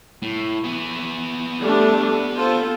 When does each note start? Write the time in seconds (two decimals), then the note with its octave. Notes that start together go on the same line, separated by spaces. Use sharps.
0.22 A2
0.64 B3 G#4
1.61 G3 A3 D4
2.35 F4 A4 C5